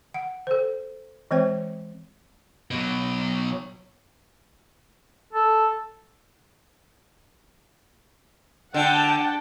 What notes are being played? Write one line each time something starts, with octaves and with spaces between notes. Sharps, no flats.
F#5
A4 C5
E3 G#3 C4 C5 C#5 G5
B2 F#3
A4
D3 F#5 G5 A5